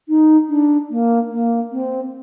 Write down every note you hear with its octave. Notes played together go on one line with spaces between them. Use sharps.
D#4
D4
A#3
A#3
C4